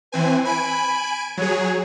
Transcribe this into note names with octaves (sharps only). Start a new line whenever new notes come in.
E3 C4 B4 G#5
G#5 B5 D7
F#3 G#4 C#5